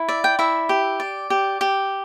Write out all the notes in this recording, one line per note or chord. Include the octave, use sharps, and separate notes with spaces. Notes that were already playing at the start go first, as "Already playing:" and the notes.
Already playing: E4
D5 E5
G5
E4 E5
G4
D5
G4
G4